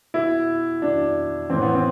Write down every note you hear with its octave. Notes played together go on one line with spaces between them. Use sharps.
B2 E4
B2 D4
A2 E3 C4
B3
C4